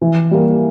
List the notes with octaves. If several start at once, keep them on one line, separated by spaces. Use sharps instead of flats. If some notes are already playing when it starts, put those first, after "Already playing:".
E3
G3 A#3